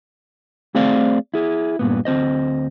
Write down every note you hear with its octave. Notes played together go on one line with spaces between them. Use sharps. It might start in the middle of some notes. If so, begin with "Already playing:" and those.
A3 C4 G#4 C5 D5 F5
E4 G#4
G2 A#2 B3
D2 C4 C5 D#5